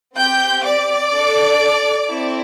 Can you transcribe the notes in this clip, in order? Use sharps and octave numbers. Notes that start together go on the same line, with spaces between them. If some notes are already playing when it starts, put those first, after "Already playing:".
C4 G4 G5 G6
D5 D6
D4
A4
C4 E4 A4